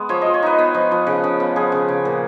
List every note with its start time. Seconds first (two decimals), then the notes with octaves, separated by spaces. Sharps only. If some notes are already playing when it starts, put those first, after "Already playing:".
Already playing: G#3 B3
0.09 F3 C#5
0.22 F3 D#5
0.34 C#5
0.43 D#4 B4
0.58 B3
0.74 F3
0.91 F3
1.07 C#3
1.24 C#3
1.40 B3
1.56 F3 G#4
1.72 C#3
1.88 C#3
2.05 A#2